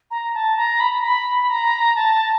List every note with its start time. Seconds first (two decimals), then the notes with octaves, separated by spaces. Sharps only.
0.11 A#5
0.34 A5
0.57 A#5
0.80 B5
1.03 B5
1.50 A#5
1.96 A5